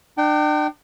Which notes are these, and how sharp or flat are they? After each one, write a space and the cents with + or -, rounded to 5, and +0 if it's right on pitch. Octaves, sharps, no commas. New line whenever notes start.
D4 +40 G5 -20